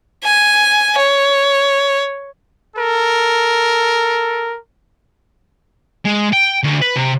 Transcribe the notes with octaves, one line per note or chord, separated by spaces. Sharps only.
G#5
C#5
A4 A#4
G#3
G5
D2
B4
C3